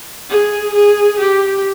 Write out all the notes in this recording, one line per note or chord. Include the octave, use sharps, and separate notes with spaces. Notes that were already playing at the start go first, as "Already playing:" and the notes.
G#4
G#4
G4